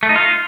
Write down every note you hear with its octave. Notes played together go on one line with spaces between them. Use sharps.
A3
D#4
F4